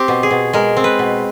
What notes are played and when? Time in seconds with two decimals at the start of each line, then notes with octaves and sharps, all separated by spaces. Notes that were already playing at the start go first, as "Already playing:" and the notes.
Already playing: C4 G4
0.08 B2
0.23 G#4
0.31 B2
0.53 G#3 A#4
0.77 C4
0.84 B4
0.99 B2